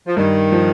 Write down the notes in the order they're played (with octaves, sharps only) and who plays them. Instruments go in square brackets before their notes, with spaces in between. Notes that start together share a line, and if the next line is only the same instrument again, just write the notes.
[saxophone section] F3
[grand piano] G2 [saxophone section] D#3
[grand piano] F3